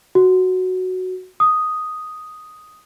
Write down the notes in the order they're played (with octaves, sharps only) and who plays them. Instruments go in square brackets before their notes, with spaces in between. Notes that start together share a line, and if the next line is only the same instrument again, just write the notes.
[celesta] F#4
D#6